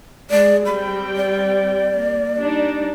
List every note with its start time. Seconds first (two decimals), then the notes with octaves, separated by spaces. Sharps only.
0.31 G#3 G#4 D5
0.66 G3 C4 G5 B5
1.16 D5
1.94 A#3
2.37 G3 D4 D#4